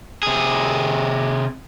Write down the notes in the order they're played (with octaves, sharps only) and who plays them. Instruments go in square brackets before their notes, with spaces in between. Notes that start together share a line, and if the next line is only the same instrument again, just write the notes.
[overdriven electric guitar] C3 G#4